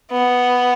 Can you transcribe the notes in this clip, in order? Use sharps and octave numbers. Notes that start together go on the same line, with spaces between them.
B3